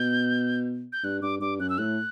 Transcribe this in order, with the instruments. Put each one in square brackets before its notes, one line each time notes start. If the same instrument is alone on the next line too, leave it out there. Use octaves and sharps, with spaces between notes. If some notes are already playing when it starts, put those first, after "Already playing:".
Already playing: [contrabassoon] B2 [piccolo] G6
[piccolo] G6
[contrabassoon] G2 [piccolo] F#6
[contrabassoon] G2 [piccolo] D6
[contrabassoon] G2 [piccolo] D6
[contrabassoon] F#2 [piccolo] F#6
[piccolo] E6
[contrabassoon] A2 [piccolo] F#6